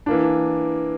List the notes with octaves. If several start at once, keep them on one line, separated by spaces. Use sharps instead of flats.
E3 A#3 D4